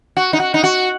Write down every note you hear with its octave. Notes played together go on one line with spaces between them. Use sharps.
F#4
D#4
F#4
D#4
F#4